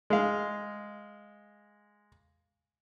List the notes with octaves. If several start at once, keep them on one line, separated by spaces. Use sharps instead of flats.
G#3 F5